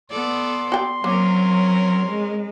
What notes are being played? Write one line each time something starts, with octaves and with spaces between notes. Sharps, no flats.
B3 A4 D5 C6
F#4 G5
F#3 A#3 C4 C#4 A#4
G#3